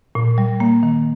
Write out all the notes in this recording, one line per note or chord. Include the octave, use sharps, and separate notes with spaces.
A#2
G3
A#3
D#3